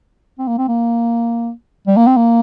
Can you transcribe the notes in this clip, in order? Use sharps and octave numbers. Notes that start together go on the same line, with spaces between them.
C4
A#3
C4
A#3
G3
A#3
C4
A#3